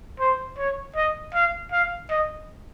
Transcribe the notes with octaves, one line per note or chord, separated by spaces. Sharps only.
C5
C#5
D#5
F5
F5
D#5